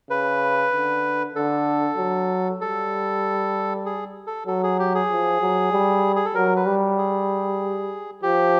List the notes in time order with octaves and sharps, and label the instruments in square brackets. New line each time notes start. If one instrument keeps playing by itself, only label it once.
[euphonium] C#3 [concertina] B4
[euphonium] D3
[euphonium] D3 [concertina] A4
[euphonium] F#3
[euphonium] G3 [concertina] A4
[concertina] G#4
A4
[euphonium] F#3 [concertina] A4
[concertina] G#4
G4
G#4
[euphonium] F3
F#3
G3
[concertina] G#4
A4
[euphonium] F#3 [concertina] A#4
[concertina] B4
[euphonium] G3
[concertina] G#4
[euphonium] F3 [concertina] G4